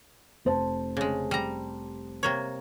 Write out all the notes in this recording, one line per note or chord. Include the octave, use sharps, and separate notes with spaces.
F1 C5 A5
C#3 G#3
G3 A#5
C3 A#3 C#5